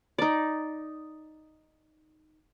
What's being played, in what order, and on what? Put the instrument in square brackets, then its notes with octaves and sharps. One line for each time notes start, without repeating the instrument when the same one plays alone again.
[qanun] D#4 D5